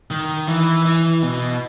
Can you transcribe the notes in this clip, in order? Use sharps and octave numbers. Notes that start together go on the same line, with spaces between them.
D#3
E3
E3
B2